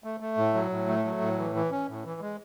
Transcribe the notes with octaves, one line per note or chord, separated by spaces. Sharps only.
A3
A3
A2
F#3
A2
A3
F#3
A2
E3
E3
C#4
A2
E3
G#3